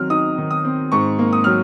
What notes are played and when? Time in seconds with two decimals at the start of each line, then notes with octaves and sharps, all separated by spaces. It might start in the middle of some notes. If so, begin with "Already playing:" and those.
Already playing: D#3 F#3 C4 F6
0.10 D#4 D#6
0.38 D#3
0.51 D#6
0.65 C4
0.92 G#2 C#6
1.19 A#3
1.33 D#6
1.44 F#3 F6